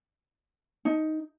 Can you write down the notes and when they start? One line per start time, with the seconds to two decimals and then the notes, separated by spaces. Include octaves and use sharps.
0.85 D#4